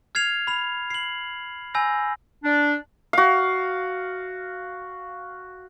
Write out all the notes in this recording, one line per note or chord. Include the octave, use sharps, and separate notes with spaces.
F6 G#6 C7 F7
B5 F7
C7 F#7
G#5 B5 E6 G6 A#6
D4
F#4 F5